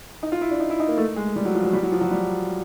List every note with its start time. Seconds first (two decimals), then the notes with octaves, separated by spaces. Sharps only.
0.23 D#4
0.32 F4
0.41 E4
0.51 D4
0.60 D#4
0.70 E4
0.80 D#4
0.88 A#3
0.98 A3
1.16 G#3
1.36 G3
1.45 F#3
1.55 F3
1.64 F#3
1.73 G3
1.83 F#3
1.92 F3
2.01 F#3
2.11 G3